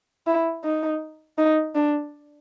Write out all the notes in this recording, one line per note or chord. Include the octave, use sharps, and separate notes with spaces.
E4
D#4
D#4
D4